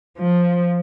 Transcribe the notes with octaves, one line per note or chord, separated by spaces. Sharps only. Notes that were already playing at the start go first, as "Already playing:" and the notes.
F3